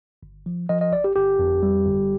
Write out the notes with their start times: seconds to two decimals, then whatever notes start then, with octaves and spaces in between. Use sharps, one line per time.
0.23 G1
0.46 F3
0.69 F3 D#5
0.81 D#5
0.93 G1 D5
1.04 G4
1.16 G1 G4
1.39 F2
1.63 G3
1.86 G1